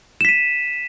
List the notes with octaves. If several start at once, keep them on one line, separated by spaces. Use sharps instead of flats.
B6 D#7 E7